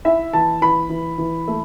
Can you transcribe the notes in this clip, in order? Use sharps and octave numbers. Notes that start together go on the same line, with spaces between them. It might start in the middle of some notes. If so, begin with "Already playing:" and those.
E4 E5
E3 A5
E3 B5
E3
E3
A3